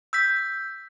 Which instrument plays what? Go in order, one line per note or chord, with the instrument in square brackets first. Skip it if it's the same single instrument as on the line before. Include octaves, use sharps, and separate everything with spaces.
[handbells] E6 G6 B6